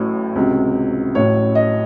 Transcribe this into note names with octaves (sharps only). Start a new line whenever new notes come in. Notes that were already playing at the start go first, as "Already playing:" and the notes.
Already playing: A1 A2 F#3
C#2 C3 F#3
A1 A2 F#3 C#5
D#5